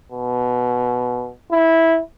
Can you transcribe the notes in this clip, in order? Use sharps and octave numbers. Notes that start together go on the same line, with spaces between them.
B2
E4